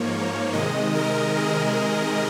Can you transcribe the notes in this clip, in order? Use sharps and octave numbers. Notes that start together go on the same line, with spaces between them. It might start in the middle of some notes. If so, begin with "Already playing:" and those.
Already playing: G#2 F3 A#3 C#5
C3 D#3 G#3 D#5
A#4
G#4